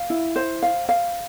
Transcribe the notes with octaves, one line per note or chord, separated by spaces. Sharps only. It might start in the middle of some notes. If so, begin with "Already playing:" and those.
Already playing: F5
E4
C5
F5
F5